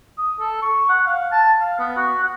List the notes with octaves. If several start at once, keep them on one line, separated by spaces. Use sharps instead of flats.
D#6
A4
C#6
F#5
F5
A5
F5
B3
F#4
F#5